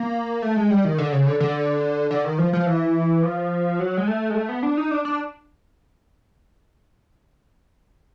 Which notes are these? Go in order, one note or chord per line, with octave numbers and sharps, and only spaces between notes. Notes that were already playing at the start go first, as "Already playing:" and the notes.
Already playing: A#3
A3
G#3
G3
D#3
D3
C#3
D3
D3
D3
D#3
F3
F3
E3
F3
F#3
G#3
A3
G#3
A3
B3
D4
D#4
D4
D4